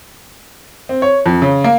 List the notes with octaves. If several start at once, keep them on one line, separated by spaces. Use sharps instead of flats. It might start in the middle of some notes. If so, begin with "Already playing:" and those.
C4
C#5
F2
C#3
A#3